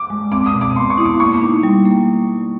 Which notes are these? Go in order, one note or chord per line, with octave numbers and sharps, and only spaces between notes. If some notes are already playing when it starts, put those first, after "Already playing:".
Already playing: D6
G#3
C4 D6
D#6
B2
D6
B3 C6
C#6
E4 D#6
D6
A#3 C#6
D#4
G3
A#3